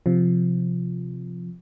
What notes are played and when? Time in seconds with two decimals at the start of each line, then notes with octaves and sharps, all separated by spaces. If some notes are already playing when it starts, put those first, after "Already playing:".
0.06 C3 F3